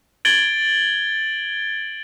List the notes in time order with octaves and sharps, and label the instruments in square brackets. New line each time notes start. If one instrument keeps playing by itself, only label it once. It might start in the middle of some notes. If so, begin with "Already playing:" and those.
[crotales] G#6 A6 D7 F#7 G7